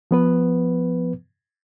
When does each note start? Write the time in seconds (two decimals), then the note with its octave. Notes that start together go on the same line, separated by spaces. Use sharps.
0.11 F3 B3 B4